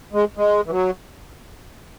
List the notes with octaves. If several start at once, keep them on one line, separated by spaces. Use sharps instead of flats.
G#3
G#3
E3
F#3